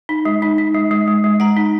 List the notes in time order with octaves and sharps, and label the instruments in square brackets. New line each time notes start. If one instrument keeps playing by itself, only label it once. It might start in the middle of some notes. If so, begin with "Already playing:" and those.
[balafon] D#4
G#3
D#4
D#4
G#3
G#3
G#3
G#3
G#3 F#5 A#5
D#4